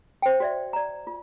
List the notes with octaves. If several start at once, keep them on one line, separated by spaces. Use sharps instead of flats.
C5 G5
F#4 D5 E5
D5 A#5
F4